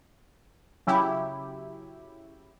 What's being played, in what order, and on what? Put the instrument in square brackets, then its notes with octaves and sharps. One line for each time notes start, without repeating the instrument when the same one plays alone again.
[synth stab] C#3 F#3 E4 G4